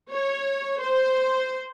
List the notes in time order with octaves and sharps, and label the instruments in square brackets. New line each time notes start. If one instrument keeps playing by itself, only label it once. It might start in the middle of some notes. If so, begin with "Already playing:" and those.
[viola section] C#5
C5